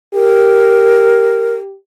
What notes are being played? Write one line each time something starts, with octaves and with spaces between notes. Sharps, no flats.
G4 A#4